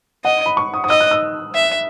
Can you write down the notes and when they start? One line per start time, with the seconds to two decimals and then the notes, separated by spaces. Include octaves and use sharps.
0.24 D#5 F#5
0.46 B5
0.57 C#6
0.74 D#6
0.84 D#6
0.89 D#5 E6
1.00 F#6
1.11 E6
1.55 E5